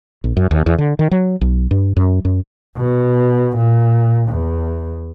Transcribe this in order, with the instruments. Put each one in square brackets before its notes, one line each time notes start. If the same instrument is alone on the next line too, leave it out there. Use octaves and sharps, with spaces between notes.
[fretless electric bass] A#1
F#2
D#2
E2
D3
D#3
F#3
B1
G2
F#2
F#2
[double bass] B2
A#2
E2